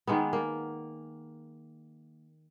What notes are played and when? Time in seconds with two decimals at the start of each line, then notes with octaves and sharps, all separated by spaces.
0.07 D#3 G#3 A#3 B3
0.33 A#3